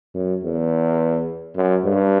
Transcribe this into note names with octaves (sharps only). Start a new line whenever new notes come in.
F#2
E2
F#2
G2